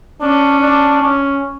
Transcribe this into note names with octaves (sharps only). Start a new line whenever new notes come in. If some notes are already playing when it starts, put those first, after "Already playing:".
C#4 D4
D4
C#4